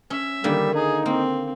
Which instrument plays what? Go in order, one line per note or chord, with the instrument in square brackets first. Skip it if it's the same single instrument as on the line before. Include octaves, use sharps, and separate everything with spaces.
[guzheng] C#4 [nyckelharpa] E5
[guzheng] D3 D#3 A#3 [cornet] G3
[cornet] D#4 [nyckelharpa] G#4
[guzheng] A#3 [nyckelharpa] C4